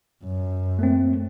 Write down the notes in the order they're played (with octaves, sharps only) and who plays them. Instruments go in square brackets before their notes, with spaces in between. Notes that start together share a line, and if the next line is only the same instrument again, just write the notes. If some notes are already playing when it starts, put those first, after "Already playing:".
[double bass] F#2
[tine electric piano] A3 A#3 C4